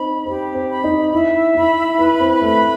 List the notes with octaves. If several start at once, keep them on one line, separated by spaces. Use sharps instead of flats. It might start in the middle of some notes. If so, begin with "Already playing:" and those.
Already playing: C4 D#4 B5
C4 G4
C4
B5
D#4
E4 E5
E4 B5
E4 B4
C4
A3 B5